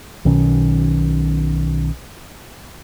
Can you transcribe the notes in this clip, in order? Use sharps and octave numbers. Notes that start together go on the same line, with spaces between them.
B1 B2 D#3 C#4